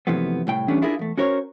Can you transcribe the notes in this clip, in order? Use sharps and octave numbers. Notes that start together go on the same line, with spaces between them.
F#2 C3 E3 F3 A3 B3
C2 A2 G5
E3 G3 A3 B3 C#4 D4
D4 E4 F4 G#4 A#4
E2 A3
C#4 F#4 A#4 C5 C#5